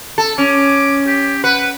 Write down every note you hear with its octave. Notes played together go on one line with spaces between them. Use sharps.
A4
C#4 D6
G4
B4 F#5